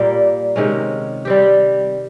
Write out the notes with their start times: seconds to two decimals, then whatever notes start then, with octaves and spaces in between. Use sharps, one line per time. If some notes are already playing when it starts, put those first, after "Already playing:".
Already playing: A#2 G3 A#3
0.56 C3 D#3 G#3 C#4
1.25 G3 C4 G4